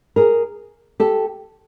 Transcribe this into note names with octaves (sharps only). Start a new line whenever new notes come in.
G#4 A#4
G4 A4